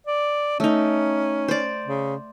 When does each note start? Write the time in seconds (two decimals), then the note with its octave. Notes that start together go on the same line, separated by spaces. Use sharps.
0.07 D5
0.60 A3 C#4 D#4
1.48 C5 D5
1.86 C#3